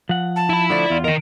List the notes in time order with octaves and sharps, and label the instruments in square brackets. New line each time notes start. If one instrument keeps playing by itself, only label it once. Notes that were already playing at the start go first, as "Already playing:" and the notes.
[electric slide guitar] F3 F#5
[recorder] A5
[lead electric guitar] E4 B5
[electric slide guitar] D3 F3 A3 [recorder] D5
[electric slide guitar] E2 F4
[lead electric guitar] D#3 A#4 [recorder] D#5